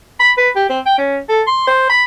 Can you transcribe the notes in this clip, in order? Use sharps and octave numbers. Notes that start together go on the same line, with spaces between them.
B5
B4
G4
C4
G5
C#4
A4
C6
C5
B5